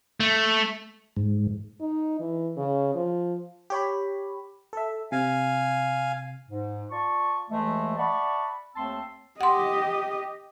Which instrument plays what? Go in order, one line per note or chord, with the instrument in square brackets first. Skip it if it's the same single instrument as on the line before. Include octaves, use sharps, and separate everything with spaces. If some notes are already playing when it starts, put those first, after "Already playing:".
[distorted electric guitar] A3
[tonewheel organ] G#2
[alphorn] D#4
E3
C#3
F3
[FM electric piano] G4 C#5 B5
A4 E5
[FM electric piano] C3 [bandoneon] F5 G#5
[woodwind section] G#2
F4 D5 A5 C#6
D#2 E3 G#3 A3
D5 E5 F#5 A5 B5 C#6
D#2 A3 C4 A5 C6 E6
[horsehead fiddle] G4 D#5 [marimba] F#5 C6